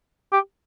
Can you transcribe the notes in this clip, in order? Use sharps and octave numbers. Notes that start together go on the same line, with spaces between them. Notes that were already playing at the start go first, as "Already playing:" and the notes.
G4